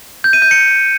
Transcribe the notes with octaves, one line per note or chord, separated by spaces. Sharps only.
G6
D#7
G6
C#7